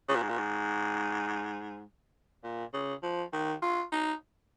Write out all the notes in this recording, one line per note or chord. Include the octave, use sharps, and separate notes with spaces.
C#3
A#2
G#2
A#2
G#2
A#2
C#3
F3
D#3
F4
D#4